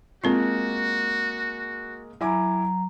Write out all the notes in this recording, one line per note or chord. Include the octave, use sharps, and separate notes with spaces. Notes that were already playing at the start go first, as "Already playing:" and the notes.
G#3 A#3 C4 F4 F#4
F#3 E4 G#5 A#5 D6